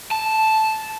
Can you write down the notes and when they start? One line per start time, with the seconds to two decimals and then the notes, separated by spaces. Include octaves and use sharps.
0.11 A5